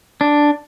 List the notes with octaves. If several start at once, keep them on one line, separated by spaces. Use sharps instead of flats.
D4